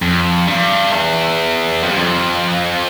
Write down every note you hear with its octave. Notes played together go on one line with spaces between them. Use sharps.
F2
G2
E2
F2
G2
F2